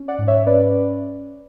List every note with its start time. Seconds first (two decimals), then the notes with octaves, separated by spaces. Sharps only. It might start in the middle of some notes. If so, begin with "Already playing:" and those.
Already playing: C#4
0.08 D5 F#5
0.19 G#2
0.27 C#5 E5
0.47 C#4 B4 D5